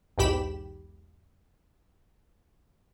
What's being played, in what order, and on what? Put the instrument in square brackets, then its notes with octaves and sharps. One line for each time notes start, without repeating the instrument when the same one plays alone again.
[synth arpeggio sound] B1 E2 G#2 G4 B5 E7